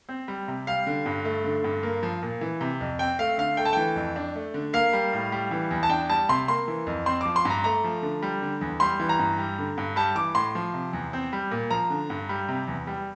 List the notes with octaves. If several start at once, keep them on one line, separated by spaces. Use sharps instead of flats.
C4
G3
C3
G3 F5
D3
G2
A3
D3
G2
A#3
F3
A#2
E3
C3
F2
C4 G5
A3 F5
D3 F5
A3 G5
A5
E3 G5
F2
D4
A3
D3
A#3 F5
G3
A2
G3
E3
E2
A5
D4 G5
G3 A5
C3 C6
A#3 C6
E3
F2
C4 C6
F3 D6
C6
G2 A#5
A3 A#5
F3
D3
G3
D3
E2
G3 C6
E3
A#5
G2
G3
D3
G2
G3 A5
E3 D6
A2 C6
F3
C3
E2
C4
G3
A#2
F3 A#5
D3
G2
G3
C3
E2
G3